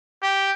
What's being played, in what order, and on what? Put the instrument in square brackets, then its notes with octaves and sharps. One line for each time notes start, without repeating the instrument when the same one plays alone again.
[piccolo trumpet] G4